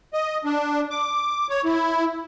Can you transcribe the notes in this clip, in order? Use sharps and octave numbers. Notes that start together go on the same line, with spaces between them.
D#5
D4
D6
C#5
E4